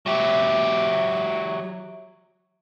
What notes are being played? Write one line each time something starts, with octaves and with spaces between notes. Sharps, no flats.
F#3 G4 E5